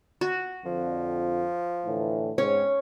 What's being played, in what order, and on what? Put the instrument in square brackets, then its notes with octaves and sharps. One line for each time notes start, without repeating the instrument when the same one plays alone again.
[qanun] F#4
[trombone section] F2 D3 [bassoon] F3
[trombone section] A2 D3 E3
[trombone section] G#2 C4 [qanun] C#4 [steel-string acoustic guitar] C#5